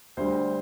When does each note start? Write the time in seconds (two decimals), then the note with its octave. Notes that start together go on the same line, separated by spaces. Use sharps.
0.17 D2 D3 G3 C5